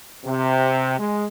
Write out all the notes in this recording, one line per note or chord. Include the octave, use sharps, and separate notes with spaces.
C3
G#3